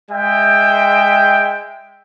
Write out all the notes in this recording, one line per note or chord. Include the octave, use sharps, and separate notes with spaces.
G#3 E5 G5